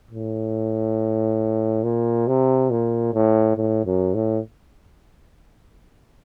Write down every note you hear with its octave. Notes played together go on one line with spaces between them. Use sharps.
A2
A#2
C3
A#2
A2
A2
F#2
A2